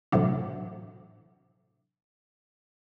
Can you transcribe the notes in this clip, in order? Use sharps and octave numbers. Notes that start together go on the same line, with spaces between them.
A2 C3 E3 F#3 D4